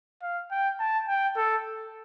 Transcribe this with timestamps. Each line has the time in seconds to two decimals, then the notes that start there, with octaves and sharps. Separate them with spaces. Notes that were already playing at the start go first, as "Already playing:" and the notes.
0.22 F5
0.51 G5
0.79 A5
1.08 G5
1.37 A4